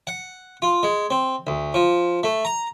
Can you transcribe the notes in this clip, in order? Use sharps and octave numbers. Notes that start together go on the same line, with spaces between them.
F#5
F4
G#3
C4
D2
F3
A3
A#5